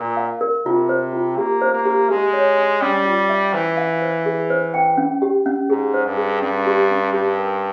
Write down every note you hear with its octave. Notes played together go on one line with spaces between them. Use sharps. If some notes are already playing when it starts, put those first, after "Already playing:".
Already playing: A#2 A#4
F5
A#4
C3 F4
C5
F4
A#3 G4
C5
A#3
G4
G#3 G4
C#5
C6
G3 C#4
F4
E5
E3 C5
F5
C5
G#4
C5
G5
C#4
G4
C#4
G#2 G#4
C5
G2
G#4
G2 C#4
G4
C#4
G2 G4
A#4